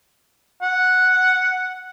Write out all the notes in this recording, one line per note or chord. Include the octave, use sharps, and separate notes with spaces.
F#5